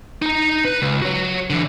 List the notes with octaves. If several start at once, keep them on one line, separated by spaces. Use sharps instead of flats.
D#4 A#5
B4
C#2
F#4 C#5
D3 E3